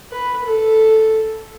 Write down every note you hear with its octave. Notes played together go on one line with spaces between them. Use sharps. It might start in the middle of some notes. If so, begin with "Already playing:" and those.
B4
A4